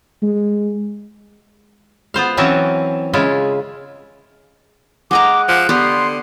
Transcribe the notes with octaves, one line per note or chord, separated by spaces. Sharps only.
G#3
B3 F4 C5 F5
E3 F#3 C4 C#4 F#4 A5
C#3 G#3 E4 F4
G#3 D#5 F#5 A#5 D6
F3 F#6
D3 B3 G4 C6